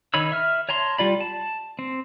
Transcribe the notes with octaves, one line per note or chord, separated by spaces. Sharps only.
D#3 D#4 C#5 B5 E6
E5 F6
C#5 A5 A#5 C6
G3 F4 D5 B5
A5
C4